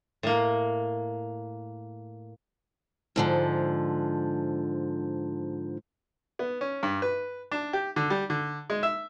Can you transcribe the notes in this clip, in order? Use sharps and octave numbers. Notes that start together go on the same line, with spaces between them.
A2 A#3
G#2 D3 F3
B3
C#4
G2
B4
D4
G4
D3
G3
D3
G#3
E5